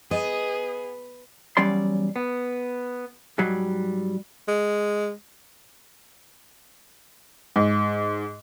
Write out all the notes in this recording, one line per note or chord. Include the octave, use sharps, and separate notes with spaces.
B3 G#4 D#5
E2 F#3 G3 C#4 D5 C6
B3
G#2 F#3 G3
G#3
G#2